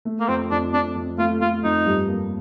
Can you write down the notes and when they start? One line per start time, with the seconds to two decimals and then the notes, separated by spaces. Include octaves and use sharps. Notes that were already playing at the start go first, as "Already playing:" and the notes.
0.05 A3
0.20 A#3
0.28 F2 C4
0.51 F2 D4
0.73 F2 D4
0.96 F2
1.18 A3 F4
1.40 A3 F4
1.63 F2 D#4
1.86 G2
2.08 A#3